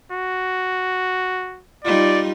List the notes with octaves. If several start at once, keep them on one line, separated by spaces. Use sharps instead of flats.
F#4
G3 D#4 F4 D5